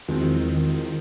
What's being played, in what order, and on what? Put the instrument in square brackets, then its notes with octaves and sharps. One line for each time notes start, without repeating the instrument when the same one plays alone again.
[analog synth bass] E2 [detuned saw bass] D#3 [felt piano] F3 G#3 C4 [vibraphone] E4 F#4